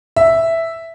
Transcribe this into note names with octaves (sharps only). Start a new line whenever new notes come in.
E5